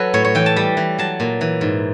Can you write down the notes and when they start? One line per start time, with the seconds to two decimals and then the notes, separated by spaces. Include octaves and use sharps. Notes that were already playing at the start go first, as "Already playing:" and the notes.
Already playing: F#3 A4 B4
0.14 A2 C#5
0.25 C#5
0.35 E3 G5
0.46 A5
0.56 G3
0.77 E3
0.99 F#3 A5
1.20 A#2
1.41 E3
1.61 G#2